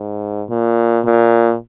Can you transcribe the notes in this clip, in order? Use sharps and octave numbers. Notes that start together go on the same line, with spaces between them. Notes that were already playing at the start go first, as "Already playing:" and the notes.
Already playing: G#2
A#2
A#2